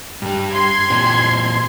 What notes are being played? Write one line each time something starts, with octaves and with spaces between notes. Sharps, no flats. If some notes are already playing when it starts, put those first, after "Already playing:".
G2 G3
C6 G#6
A#2 E3 C4